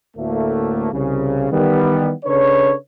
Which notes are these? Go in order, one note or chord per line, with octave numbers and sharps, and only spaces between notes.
D2 A2 A3 A#3
C2 C#3
D#3 E3 G3 B3
C#3 D4 A4 B4 C#5